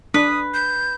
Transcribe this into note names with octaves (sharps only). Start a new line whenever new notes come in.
D4 B4 D#6
G6